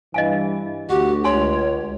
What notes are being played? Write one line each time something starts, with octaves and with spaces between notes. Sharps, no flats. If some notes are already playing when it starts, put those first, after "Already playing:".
G2 E3 D#5 F5 G#5
D2 F#4 G4
C#2 C#5 G#5 C6